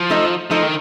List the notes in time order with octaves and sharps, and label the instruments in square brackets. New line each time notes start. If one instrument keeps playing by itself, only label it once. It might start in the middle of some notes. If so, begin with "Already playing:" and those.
Already playing: [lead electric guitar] F3
[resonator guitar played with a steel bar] A3 D#4 A4 D#5
[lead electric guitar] F3 [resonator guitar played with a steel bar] A3 D#4 A4 D#5
[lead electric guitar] D#3